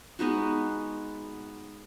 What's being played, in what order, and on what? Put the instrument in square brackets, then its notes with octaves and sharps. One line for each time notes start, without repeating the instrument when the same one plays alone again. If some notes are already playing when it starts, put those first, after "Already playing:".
[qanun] G#3 B3 D#4 F#4